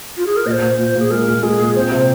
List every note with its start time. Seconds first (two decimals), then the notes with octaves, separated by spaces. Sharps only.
0.17 F4
0.26 G#4
0.36 A#4
0.46 A#2 D#5
0.52 C5
0.62 A#2
0.79 A#2 C5
0.95 A#2 G#4
1.11 G#3 A#4
1.28 A#2
1.43 G#3 G#4
1.60 A#2
1.76 C4 C5
1.91 C3